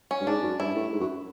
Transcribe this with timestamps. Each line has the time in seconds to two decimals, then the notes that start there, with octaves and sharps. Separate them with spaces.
0.11 C#4
0.21 G2
0.27 G#2 D4
0.43 F#2
0.60 G2 E4
0.76 A2
0.92 G#2
1.00 F#2